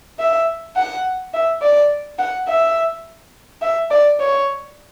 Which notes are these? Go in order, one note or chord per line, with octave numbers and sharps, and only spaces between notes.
E5
F#5
E5
D5
F#5
E5
E5
D5
C#5